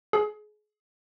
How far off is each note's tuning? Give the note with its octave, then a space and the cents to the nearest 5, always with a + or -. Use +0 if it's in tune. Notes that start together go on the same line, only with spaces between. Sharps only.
G#4 +30